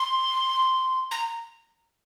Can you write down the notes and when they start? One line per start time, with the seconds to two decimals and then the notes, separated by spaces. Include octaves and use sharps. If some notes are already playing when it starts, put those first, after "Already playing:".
Already playing: C6
1.11 A#5